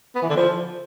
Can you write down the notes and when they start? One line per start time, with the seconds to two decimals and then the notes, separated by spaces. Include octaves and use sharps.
0.15 B3
0.22 E3
0.29 D3
0.36 F3